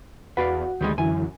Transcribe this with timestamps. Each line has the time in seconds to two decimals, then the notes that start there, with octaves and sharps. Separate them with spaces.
0.37 E2 F#4 B4 D5 F5 F#5
0.81 D2 D#3 G3 G#3
0.98 F#2 D3 E3 E4 G#5